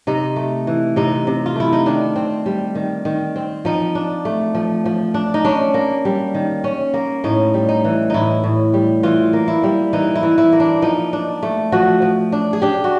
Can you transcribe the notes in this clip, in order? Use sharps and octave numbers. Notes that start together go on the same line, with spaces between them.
C3 D#4
A3
E3
C3 D#4
C3
F4
A3 E4
D#4
D#3 D4
C4
G3
D#3
D#3
C4
F3 D#4
D4
A3
F3
F3
D4
D#4
C#4 D4
A#3
G3
D#3
C#4
A#3
A2 D#4
G3
D#4
E3
A2 D#4 E4
A2
G3
E3 F4
A#3
E4
G3
E3 D#4
E4
E3
E4
A#3
D4
F3 D#4
D4
A3
F3 F#4
F3
D4
G#4
D4 G4
F#4